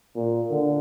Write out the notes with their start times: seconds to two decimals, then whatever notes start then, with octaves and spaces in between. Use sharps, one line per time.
0.16 A#2
0.50 D3